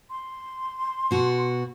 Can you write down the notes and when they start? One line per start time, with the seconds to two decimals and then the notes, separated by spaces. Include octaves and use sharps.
0.10 C6
1.11 B2 F#4